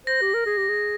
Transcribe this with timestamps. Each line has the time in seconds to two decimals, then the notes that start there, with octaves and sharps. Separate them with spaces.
0.07 C5 A#6
0.21 G4
0.34 A#4
0.46 G#4
0.57 G4
0.69 G#4